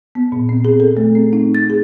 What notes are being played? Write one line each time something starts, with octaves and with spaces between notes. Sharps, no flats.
B3
A#2
C4
G#4
A4
A3
C4
D#4
A6
G#4